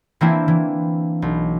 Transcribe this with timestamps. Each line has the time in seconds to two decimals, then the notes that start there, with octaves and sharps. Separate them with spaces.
0.21 E3 A#3 C4 D4 E4
0.48 E3
1.22 B1